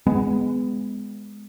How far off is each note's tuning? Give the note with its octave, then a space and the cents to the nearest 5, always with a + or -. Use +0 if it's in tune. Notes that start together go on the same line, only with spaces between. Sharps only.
G#3 +0 B3 +20